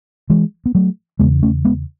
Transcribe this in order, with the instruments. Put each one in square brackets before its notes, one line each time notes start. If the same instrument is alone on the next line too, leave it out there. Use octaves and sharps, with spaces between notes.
[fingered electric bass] E3 G#3
B3
F#3 A3
E2 C#3 G#3 B3
A3 C#4
G#3 B3